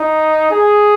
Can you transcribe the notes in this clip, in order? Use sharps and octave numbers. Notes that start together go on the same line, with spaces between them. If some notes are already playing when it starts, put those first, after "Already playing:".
Already playing: D#4
G#4